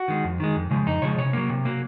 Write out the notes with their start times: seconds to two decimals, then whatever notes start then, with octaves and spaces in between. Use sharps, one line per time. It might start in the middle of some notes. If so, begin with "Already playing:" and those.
Already playing: F#4
0.08 D#3 G#3
0.24 F2
0.40 D#3 G#3
0.56 F2
0.71 C#3 F3 G#3
0.87 F2 D#4
1.02 C#3 F3 G#3 C#5
1.18 C3 C#5
1.33 F#3 A#3
1.50 C3
1.65 F#3 A#3